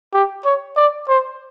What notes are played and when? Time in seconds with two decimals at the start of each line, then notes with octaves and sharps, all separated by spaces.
0.14 G4
0.45 C#5
0.76 D5
1.08 C5